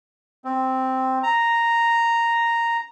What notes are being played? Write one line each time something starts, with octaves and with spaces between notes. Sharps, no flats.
C4
A#5